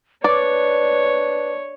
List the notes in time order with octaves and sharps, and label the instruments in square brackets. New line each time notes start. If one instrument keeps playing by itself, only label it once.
[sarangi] D4 [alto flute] B4 [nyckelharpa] C#5 [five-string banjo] D5